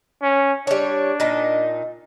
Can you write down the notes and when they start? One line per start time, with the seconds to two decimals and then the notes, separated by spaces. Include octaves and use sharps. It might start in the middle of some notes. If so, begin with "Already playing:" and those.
0.22 C#4
0.67 G3 D4 C#5
1.20 A#2 D#4